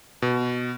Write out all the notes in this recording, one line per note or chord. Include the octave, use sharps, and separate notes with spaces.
B2